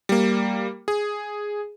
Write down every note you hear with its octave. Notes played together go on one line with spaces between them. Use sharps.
G3 A#3
G#4